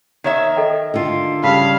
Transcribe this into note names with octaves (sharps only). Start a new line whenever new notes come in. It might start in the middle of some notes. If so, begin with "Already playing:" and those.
D#3 C#5 E5
A4 D#5 G5
D3 F4
C#3 G3 F5 A5 B5 B6